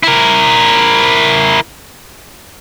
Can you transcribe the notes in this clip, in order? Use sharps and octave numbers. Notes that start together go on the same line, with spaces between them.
E4 A#4